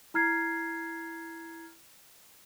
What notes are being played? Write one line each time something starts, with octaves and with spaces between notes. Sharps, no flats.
E4 A#5 F6 G#6 C7